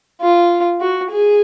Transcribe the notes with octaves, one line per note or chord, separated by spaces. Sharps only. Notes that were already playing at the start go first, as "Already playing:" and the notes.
F4
F#4
G#4